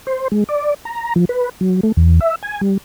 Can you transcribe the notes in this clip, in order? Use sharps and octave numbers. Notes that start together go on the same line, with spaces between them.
C5
G#3
D5
A#5
F3
B4
F#3
A3
E2
E5
G#5
G3